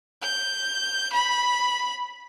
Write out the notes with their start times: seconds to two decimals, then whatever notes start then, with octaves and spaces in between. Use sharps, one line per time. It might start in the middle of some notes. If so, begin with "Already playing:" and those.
0.23 G6
1.13 B5